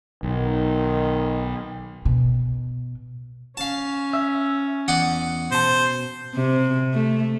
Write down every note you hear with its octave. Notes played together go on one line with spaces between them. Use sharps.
B1 D#3
B2
C#4 F5 A5
E5
E2 D5 D#5 F#5
B2 C5 A5
C3
A3